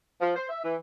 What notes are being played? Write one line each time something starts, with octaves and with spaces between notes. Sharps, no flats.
F3
C5
E5
E3